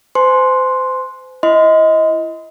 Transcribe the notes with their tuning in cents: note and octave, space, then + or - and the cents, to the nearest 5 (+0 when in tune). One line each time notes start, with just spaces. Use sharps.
C5 -35 G#5 +35 C6 +0
E4 +30 D#5 +25 C6 -30